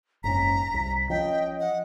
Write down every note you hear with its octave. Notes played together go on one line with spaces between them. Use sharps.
F#1 G#2 C#4 A#5 B6
C2
F3 C#4 D#5 G5
F#5